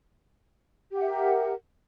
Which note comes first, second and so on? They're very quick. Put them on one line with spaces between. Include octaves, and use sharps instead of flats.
G4 F#5 E5 A#4